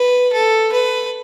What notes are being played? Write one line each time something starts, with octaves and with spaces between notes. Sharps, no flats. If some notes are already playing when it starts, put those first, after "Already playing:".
Already playing: B4
A4
B4